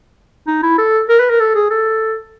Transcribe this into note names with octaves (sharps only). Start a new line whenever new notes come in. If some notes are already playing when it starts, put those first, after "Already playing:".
D#4
E4
A4
A#4
B4
A#4
A4
G#4
A4